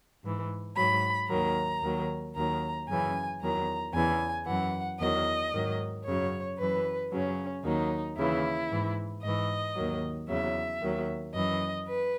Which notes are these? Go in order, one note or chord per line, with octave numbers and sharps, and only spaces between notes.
G#2 E3
G#2 F#3 B5
D#2 D#3 F#3 A#5
D#2 D#3 F#3
D#2 D#3 F#3 A#5
F#2 C#3 E3 G#5
E2 D#3 F#3 A#5
E2 C#3 E3 G#5
F#2 E3 F#5
E2 D#3 F#3 D#5
G#2 D#3 F#3
F#2 C#3 F#3 C#5
F#2 E3 B4
F#2 C#3 F#3 C#4
D#2 D#3 F#3 D#4
D#2 C#3 E3 E4
G#2 E3
G#2 E3 D#5
D#2 D#3 F#3
E2 C#3 F#3 E5
D#2 D#3 F#3
F#2 E3 D#5
B4